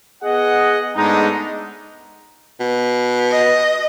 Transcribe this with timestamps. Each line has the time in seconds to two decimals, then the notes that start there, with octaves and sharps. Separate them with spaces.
0.23 B3 G#4 D#5 F#5
0.97 G#2 G#3 A3 B3 D4 D#4
2.60 B2
3.32 D#5